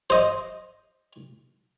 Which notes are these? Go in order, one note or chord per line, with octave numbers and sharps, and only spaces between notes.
C5 D#5